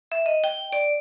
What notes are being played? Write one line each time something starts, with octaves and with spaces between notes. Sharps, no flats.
E5
D#5
G5
D5